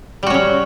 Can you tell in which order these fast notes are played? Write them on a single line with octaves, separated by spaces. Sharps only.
G3 F#4 C#4 F#3